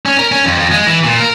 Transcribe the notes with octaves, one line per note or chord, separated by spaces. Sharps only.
C#4
A#4
C#4
F2
F2
G#3
E3
A#2
A#4